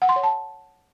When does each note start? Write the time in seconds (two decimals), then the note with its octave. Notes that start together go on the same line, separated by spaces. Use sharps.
0.02 F#5
0.09 C6
0.16 C#5
0.23 A5